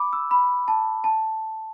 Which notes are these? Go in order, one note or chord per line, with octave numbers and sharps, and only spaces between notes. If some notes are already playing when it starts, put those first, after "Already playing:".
Already playing: B5 D6
E6
B5
A5
A5